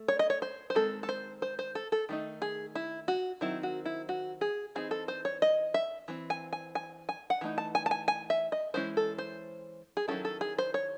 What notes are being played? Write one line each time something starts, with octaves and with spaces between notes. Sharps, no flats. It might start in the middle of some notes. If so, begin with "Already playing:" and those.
Already playing: A3
C#5
D#5
C#5
C5
C5
D#3 G#3 C4 A4
A4
C5
C5
C5
A4
A4
D#3 A3 D#4
G#4
E4
F#4
D#3 F#3 C4 D#4 E4
F#4
E4
F#4
G#4
E3 C4 D#4 G#4
A4
C5
C#5
D#5
E5
E3 C4
G#5
G#5
G#5
G#5
F#5
E3 A3 D#4
A5
G#5
A5
G#5
G#5
E5
D#5
E3 G#3 C#4 E4 C5
A4
C5
G#4
D#3 F#3 C#4 E4 A4
A4
G#4
C5
C#5